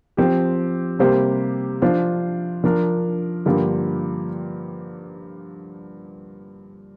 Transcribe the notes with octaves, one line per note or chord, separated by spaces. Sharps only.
F3 C4 G4
C3 G3 A#3 G4 C5
F3 D4 F4 C5
F3 D4 A#4
G2 D3 F3 A#3 G4